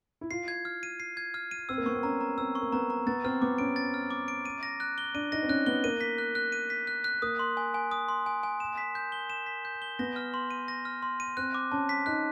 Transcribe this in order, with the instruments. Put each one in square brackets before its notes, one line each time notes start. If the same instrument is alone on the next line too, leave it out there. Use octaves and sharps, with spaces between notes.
[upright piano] E4
[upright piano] F4 [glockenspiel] C7
[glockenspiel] G#6
F6
D#7
C7
G#6
F6
D#7
[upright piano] C4 [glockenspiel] E6
[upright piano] A#3
[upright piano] B3 [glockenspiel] C#6
[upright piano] C4
[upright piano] C#4 [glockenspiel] A#5
[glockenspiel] A#5
[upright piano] C4 [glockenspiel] E6
[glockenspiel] C#6
[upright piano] A#3
[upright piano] B3 [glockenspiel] A#5
[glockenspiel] A#5
[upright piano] B3 [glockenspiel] A6
[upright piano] C4 [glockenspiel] F6
[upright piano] B3 [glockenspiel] D6
[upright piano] C#4 [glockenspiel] D7
[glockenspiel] A6
F6
D6
D7
D#7
A#6
F#6
G7
[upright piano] D4 [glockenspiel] D#7
[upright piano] D#4 [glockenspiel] A#6
[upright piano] C4
[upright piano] C#4 [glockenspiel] F#6
[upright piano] B3 [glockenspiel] G7
[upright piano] A#3 [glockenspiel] D#7
[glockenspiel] B6
F#6
F#6
D#7
B6
F#6
F#6
[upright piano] A#3 [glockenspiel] D#6
[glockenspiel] C6
G#5
G#5
D#6
C6
G#5
G#5
E7
B6
G6
G7
E7
B6
G6
G7
[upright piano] B3 [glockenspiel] A#6
[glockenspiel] F6
C6
D#7
A#6
F6
C6
D#7
[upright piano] C4 [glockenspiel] F#6
[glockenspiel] D6
[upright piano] C#4 [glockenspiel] A5
[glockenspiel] B6
[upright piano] D#4 [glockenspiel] F#6